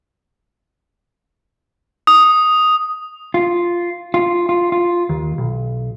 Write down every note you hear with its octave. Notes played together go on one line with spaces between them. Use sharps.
D#6
F4
F4
F4
F4
D#2
B1